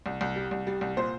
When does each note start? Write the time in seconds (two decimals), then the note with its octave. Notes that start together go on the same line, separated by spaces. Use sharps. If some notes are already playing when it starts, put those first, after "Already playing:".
0.06 C2
0.21 C2
0.36 G3
0.51 C2
0.67 G3
0.81 C2
0.97 A#2 C5